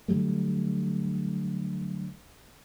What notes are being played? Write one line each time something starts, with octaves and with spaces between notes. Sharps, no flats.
D3 F#3 G3 A3